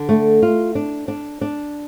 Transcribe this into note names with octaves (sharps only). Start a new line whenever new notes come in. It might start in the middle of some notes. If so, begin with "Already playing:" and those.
Already playing: D3
A3
F4
D4
D4
D4